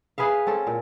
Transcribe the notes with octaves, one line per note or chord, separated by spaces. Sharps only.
G#4 B4 E5 F5
C4 C#4 A4
A#2